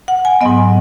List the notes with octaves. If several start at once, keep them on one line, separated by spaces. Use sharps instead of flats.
F#5
G#5
G#2 F#3 B3 D#5